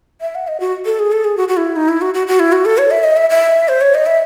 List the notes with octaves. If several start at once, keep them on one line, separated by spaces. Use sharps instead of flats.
E5
F#5
D#5
F#4
A4
G#4
A4
G#4
F#4
F#4
E4
D#4
E4
F#4
F#4
F#4
E4
F#4
A4
C#5
E5
D#5
E5
E5
C5
C#5
D#5
E5